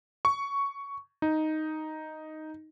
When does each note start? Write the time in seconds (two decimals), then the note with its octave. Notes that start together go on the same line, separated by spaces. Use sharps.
0.25 C#6
1.22 D#4